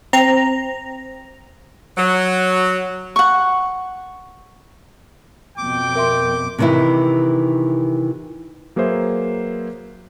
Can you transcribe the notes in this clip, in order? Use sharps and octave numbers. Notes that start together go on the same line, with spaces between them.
C4 A#5
F#3
F#5 C#6
F2 B2 G5 D6
A#4 E5 C6
C3 D#3 E3 D#4 E4
F#3 A#3 G#4 B4 C5 E5